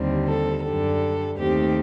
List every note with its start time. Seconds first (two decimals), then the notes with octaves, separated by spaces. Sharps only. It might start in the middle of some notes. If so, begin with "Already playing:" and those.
Already playing: D#2 D3 G3 C4
0.26 A4
0.63 F#2 D3 G3 A4
1.38 D#2 D#3 A3 C4 G4